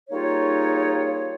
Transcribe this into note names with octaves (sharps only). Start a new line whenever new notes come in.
G3 A#3 D#4 F4 G#4 C#5